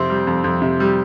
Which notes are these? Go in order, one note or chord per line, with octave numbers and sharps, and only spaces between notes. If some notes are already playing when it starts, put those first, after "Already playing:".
Already playing: F2 C3 C4
G3
F2
F2
C3
G3